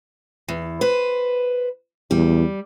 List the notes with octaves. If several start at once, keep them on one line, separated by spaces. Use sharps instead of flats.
E2
B4 C5
E2 G3